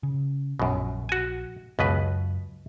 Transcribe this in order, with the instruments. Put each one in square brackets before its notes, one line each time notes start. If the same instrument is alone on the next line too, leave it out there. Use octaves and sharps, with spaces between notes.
[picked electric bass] C#3
[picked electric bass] A#1 [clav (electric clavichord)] F#2 B2
[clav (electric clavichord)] F#4 G#5
[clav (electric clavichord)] C#2 B2 B4 [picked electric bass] F#2